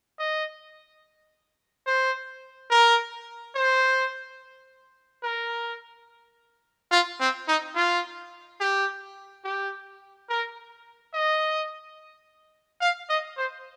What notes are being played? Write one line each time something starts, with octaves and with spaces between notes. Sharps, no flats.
D#5
C5
A#4
C5
A#4
F4
C4
D#4
F4
G4
G4
A#4
D#5
F5
D#5
C5